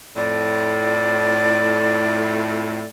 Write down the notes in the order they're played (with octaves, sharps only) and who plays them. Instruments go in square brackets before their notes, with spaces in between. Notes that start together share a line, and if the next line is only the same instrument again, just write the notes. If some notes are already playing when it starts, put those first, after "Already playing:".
[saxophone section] F2 A2 [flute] D5